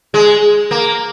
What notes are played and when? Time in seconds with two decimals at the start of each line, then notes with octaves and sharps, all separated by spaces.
0.14 G#3
0.71 A#3